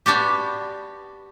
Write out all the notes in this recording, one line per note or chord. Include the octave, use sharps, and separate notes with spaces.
B3 D4 F#4 G4